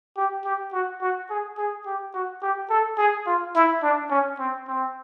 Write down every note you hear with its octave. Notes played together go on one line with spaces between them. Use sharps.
G4
G4
F#4
F#4
G#4
G#4
G4
F#4
G4
A4
G#4
F4
E4
D4
C#4
C4
C4